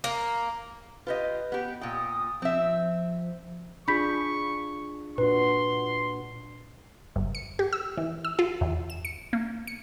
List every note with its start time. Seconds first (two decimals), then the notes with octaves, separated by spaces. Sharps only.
0.04 A#3
1.07 F4 G4 B4 D#5
1.52 B3 G4
1.81 A#2 G5 D#6
2.42 F3 C4 E5
3.88 D4 F4 G#4 B5 C#6 G6 B6
5.18 A#2 D4 F#4 B4 C6
7.16 G1
7.35 C#7
7.59 G4
7.73 E6
7.97 E3
8.24 E6
8.39 F4
8.61 E2
8.90 E7
9.05 C#7
9.33 A#3
9.67 C#7